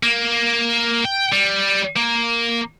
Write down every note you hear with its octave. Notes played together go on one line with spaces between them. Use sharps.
A#3
G5
G3
A#3